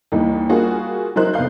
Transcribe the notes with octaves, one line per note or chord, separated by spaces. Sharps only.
D#2 E3 G3 D#4
G3 A#3 F4 F#4 G#4
F#3 D#4 E4 A#4 C5 F#6
F1 B3 F5 G6